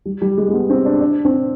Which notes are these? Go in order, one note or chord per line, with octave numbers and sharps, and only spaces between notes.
G3
G3
G#3
G#3
B3
C4
D4
D4
C4